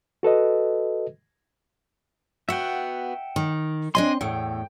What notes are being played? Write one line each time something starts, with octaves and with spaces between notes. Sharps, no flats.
F#4 A4 B4 D#5
B3 F#4 E5 F#5 G5
D#3
C4 D4 D#5 G#5 C6
E2 A2 G5